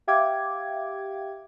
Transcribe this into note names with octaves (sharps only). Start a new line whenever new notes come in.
G4 E5 F5 G5 D6 G#6